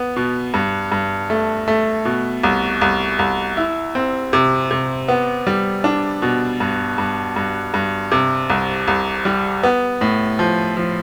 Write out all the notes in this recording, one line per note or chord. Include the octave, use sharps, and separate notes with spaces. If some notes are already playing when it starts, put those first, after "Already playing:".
Already playing: B3
B2
G2
G2
A3
A3
B2
C2
C2
C2
E4
C4
C3
C3
B3
G3
D4
B2
G2
G2
G2
G2
C3
C2
C2
G3
B3
A2
F3
F3